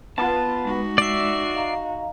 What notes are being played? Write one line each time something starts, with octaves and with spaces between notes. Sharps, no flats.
B3 F4 A5
G#3 D#4 F#4
D5 E5 C7
D#5 F5 A#5